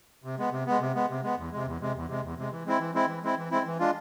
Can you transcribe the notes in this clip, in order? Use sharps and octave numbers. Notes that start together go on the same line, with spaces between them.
C3
G#3 B3
C3
G#3 B3
C3
G#3 B3
C3
G#3 B3
E2
C3 G#3
E2
C3 G#3
E2
C3 G#3
E2
C3 G#3
E3
G#3 C4 E4
E3
G#3 C4 E4
E3
G#3 C4 E4
E3
G#3 C4 E4
E3
G#3 D4 F4